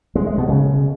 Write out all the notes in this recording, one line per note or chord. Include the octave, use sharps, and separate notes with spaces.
G#3
G#3
B2
C#3